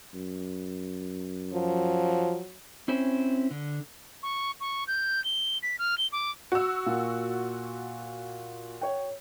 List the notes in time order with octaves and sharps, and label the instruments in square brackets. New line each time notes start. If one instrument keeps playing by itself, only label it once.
[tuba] F#2
[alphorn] F3 [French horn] F#3
[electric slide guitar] C4 C#4 E4 C5
D3
[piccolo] C#6
C#6
G6
G7
B6
F6
G7
D6
[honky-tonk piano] F#4 E6
[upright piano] A#2
C#5 G5